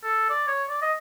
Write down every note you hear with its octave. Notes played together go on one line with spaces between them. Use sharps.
A4
D5
C#5
D5
D#5